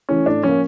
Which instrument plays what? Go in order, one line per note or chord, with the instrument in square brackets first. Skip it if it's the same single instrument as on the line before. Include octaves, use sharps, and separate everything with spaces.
[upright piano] E3 A3 E4 [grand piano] C#4
[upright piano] A2 [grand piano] D4
[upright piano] F3 A#3 [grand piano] C#4